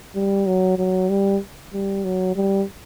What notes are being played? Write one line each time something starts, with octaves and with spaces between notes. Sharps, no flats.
G3
F#3
F#3
G3
G3
F#3
G3